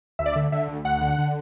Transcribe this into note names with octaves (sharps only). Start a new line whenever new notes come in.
D2 E5
D5
E5
D3
D3 E5
D2
D2 F#5
D3
D3